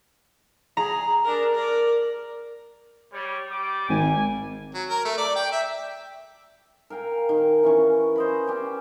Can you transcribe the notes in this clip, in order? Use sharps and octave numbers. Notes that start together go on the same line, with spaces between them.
G#4 A#5
D4 A#4
A#4 D5
G3 C#5
G3 G5 D6
G#1 G#5
F#3
A#4
A3
D5
G5
E5
A#4 F5 G5 G#5
D#3
E3 C#4 C#6
C5 D#5 B5
C#4 G4